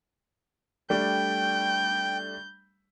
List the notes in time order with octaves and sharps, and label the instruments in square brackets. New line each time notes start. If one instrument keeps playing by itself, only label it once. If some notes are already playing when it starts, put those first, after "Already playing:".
[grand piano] G3 A3 D4 [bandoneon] G5 [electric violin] G6